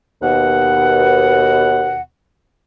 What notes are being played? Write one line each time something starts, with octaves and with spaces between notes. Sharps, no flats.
D#2 B2 F#5